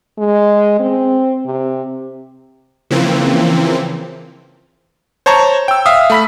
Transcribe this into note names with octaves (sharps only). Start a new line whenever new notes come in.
G#3
C4
C3
C#3 E3 F3 A#3 C4
C5 C#5 A5 A#5 C#6
G5 E6
E5 F5 D#6
A3 B5 B6